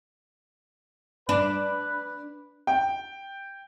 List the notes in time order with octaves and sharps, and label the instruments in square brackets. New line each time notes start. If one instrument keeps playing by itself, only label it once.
[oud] D4 [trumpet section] B4
[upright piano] G5